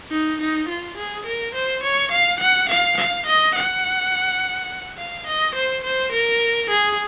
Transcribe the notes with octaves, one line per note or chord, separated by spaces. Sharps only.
D#4
D#4
F4
G#4
A#4
C5
C#5
F5
F#5
F5
F5
D#5
F#5
F5
D#5
C5
C5
A#4
G#4